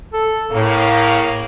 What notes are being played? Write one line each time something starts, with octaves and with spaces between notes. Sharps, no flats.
A4
A2 C#3 A#3